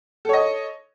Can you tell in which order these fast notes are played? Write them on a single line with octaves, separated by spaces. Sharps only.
A4 C#5 D#5